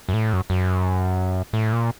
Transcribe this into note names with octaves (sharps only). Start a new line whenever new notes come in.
F#2
A2
F#2
F#2
A2
A#2